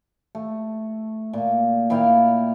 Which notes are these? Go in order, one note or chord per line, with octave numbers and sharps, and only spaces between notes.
A3
A#2
A#2 E4 F5 G5